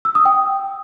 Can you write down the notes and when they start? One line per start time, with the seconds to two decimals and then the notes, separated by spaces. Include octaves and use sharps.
0.05 E6
0.15 D#6
0.25 G5